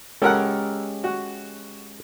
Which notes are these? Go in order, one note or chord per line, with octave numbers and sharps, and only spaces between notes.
G#3 C#4 G4 A4 A#4 F#5
F#4